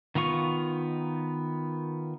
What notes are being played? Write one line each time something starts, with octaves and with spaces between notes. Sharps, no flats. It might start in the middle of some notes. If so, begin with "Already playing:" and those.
D#3 B3 F4 C#6